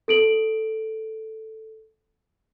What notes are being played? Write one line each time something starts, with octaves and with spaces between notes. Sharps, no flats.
A4 D7 F#7